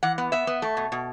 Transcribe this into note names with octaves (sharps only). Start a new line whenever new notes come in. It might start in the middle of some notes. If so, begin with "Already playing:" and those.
E3 F#5
B3
B3 E5
B3
A3
B2
B2